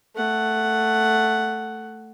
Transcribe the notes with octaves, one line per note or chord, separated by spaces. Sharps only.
A3 F#5